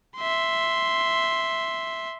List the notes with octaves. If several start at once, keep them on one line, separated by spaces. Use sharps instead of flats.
E5 C6